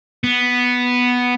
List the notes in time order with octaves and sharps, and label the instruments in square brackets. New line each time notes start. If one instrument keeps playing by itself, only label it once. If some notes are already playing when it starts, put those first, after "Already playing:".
[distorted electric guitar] B3